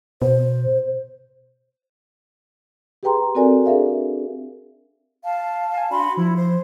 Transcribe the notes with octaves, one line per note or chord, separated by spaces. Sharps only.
B2 C5
G4 G#4 B4 G5 A#5 C6
C4 F#4 A4 A#4 D5 G#5
D4 G#4 A#4 E5 F5
F5 A5
G#5
D4 F#4 B5 C6
F3 E4
C5